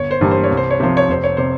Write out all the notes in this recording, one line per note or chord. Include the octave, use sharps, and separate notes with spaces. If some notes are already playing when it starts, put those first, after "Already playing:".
Already playing: G1 C#5
C5
G2 E3 G3 A#3
C5
C#5
C2
C5
C#5
C3 F3 C5
C#5
F1 C5
C#5
C3 C5